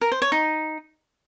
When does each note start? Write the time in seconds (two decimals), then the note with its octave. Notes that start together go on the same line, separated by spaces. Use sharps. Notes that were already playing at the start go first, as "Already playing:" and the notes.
0.01 A#4
0.12 C5
0.22 C#5
0.32 D#4